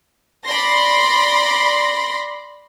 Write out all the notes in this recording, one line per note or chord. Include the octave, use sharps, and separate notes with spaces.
D5 B5 C6 A#6